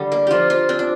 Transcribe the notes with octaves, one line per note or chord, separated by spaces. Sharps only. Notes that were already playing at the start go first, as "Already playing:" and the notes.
Already playing: D3 G3
A#3
F3 F4 G4
F3 F4
C4 D4
D4